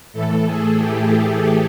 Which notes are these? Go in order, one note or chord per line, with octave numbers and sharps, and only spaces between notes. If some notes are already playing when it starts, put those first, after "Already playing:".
A2 E3 A3 A4
G#4
G4